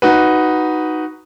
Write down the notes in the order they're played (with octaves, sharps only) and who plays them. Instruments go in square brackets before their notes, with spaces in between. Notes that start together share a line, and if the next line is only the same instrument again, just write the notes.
[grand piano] D#4 F#4 B4